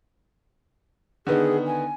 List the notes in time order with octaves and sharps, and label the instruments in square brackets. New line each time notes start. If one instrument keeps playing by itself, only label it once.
[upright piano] D3 D#3 B3 [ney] G#4
[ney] G#5